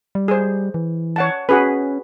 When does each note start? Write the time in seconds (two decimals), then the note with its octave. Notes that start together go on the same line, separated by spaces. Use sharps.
0.15 G3
0.28 G#4 C5
0.74 E3
1.16 C#5 F#5 A5
1.49 C#4 F#4 G#4 B4